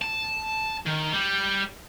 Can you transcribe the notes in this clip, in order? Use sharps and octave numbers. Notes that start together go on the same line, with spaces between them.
A5
D#3
G3